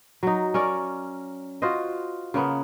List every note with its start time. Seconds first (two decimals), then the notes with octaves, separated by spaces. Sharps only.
0.23 F#3 D#4
0.54 C#4 A#4 C#5 D5
1.62 F4 F#4 C5 D#5
2.34 C#3 A#3 B3